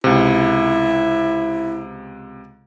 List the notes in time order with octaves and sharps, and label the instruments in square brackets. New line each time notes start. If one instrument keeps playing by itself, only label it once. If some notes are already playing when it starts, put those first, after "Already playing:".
[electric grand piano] C#2 C3 [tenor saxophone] E4